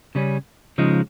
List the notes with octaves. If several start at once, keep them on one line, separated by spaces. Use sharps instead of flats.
C#3 G3 C#4
C#3 F3 G#3 D#4